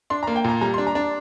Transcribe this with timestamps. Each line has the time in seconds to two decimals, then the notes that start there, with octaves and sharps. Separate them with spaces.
0.10 D4 C6
0.23 A#5
0.27 A#3
0.36 G5
0.44 A#2 A#5
0.61 G3 A#5
0.74 C6
0.78 D4
0.87 A#5
0.95 D4